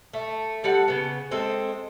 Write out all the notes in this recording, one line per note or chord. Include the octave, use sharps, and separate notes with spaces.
A3
G3 A4 F#5
C#3 B3
G#3 C4 A4